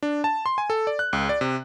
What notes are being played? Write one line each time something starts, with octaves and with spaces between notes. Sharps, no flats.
D4
A5
C6
G#5
A4
D5
F#6
C#2
D5
C3